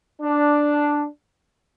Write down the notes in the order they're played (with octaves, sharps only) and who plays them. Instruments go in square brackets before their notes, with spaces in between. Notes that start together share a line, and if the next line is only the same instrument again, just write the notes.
[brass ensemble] D4